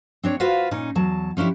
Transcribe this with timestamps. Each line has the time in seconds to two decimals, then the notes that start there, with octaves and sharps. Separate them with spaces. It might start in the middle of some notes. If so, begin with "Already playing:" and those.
0.23 C4 D4 C#5
0.40 F4 F#4 B4 C5 F5
0.71 A#2 C#4 D#4
0.95 E2 F#3 A5
1.37 F3 C#4 D4 E4 G4